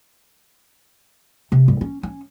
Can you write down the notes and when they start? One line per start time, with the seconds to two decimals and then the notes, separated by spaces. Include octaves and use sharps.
1.52 C3
1.68 G2
1.81 C#4
2.03 C#4